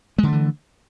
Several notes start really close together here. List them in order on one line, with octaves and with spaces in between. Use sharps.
G#3 D3 A3 E3